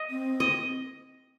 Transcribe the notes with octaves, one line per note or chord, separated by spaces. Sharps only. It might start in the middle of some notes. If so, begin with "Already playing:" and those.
Already playing: D#5
C4
D#5